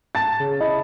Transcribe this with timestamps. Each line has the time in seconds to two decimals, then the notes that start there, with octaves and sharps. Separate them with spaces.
0.15 A5 A6
0.40 C#3
0.61 E4 D#5